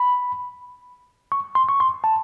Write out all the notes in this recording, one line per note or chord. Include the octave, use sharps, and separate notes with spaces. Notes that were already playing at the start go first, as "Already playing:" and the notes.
Already playing: B5
C#6
C6
C#6
C6
A5